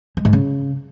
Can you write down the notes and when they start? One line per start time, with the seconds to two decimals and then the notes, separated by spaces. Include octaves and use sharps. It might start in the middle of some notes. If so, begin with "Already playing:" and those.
0.17 G#3
0.25 G#2
0.33 C#3